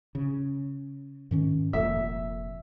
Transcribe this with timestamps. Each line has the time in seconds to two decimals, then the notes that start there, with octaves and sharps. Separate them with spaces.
0.15 C#3
1.31 G#2 D#3 C#4
1.73 F1 F2 A#2 E5